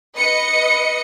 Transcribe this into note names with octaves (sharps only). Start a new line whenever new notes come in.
B4 D#5 C#7